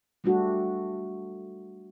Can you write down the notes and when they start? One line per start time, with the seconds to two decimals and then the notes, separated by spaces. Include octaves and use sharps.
0.24 G3 A3 D4 F#4 A4